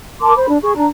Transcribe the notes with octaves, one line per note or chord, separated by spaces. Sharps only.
A#4 A5 C6 D6
C5 B5
D4
G#4 C#6
D4 A#5